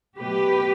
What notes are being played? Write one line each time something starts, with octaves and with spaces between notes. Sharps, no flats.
B2 F#3 A3 G4 B4